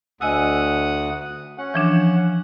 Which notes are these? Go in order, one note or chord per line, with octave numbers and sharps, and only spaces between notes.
D2 D#5 F#5 G#5 D#6 E6
C#4 F#5
E3 F3 D4